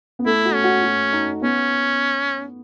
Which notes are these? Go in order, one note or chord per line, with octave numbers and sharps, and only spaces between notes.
B3
A3 E4
F#4
C#4
F#4
F#4
D#4
B3 C#4